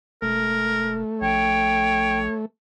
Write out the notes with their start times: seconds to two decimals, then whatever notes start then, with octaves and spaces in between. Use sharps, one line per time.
0.22 E1 A3 A#4
1.21 A#1 C#5 G5